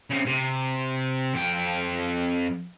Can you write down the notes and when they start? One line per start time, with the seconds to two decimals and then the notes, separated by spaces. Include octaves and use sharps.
0.10 C#3 C4
0.26 C3
1.34 F2 G5